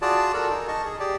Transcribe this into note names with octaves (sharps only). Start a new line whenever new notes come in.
F4 F#4 G#4 D5 A5
F#4 A4 A#4
D#4 G#4 A#4
D#5 A5 C#6
G#4
G4 G#4 D5